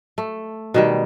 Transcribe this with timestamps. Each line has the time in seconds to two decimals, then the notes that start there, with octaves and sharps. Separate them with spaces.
0.18 A3
0.74 B2 D#3 G3